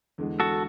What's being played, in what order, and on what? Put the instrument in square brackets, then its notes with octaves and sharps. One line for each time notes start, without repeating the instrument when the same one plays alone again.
[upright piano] E2 D3 G#3
[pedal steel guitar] F#4 A4